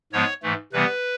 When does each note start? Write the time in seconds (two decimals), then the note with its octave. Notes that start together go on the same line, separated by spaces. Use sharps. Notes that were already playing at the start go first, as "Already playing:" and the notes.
0.12 G#2 F3 G#3 B3 C#5
0.43 G#2 E3 A3
0.73 C3 E3 G3 B3 B4